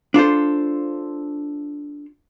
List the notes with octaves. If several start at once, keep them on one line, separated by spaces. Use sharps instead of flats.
D4 F4 A4 C5